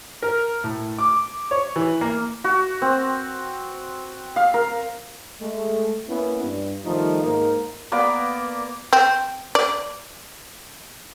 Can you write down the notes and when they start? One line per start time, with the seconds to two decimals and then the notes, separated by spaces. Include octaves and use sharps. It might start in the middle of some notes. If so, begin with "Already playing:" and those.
0.22 A#4
0.64 A2
0.99 D6
1.51 C#5
1.76 E3
2.01 A#3
2.44 F#4
2.82 C4
4.36 F5
4.54 A#4
5.40 G#3 A3
6.08 A#3 B3 C#4 E4
6.43 G2
6.85 D#3 F3 G3 A3 D#4
7.22 G#2 A#3 D#4 A#4
7.92 A#3 B3 D5
8.93 C4
9.55 D5